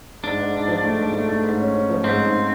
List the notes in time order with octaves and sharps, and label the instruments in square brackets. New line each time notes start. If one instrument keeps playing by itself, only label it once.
[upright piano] G#2 [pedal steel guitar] D4
[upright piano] G#2
G#2
F3
A3
G#2
A3
A3
G#2
C#4
C#4
F3
[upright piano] G#2 [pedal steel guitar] C4
[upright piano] G#2